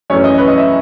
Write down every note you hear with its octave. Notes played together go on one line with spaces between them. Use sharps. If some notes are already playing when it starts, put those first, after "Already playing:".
F#2 E3 A3 C#4 C#5
D#5
B4
D#5
E5